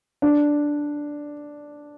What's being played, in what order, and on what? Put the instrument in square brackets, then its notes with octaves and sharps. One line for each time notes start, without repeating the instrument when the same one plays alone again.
[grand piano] D4